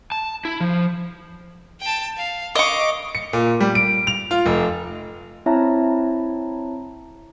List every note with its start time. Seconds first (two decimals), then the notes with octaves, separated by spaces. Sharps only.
0.12 A5
0.45 E4
0.61 F3
1.81 G5 A5
2.18 F5
2.55 D#5 F5 C#6 D6
3.15 C#7
3.33 A#2
3.60 G3
3.75 D7
4.07 F7
4.31 F4
4.46 F1
5.46 C4 E4 C#5 E5 A5 A#5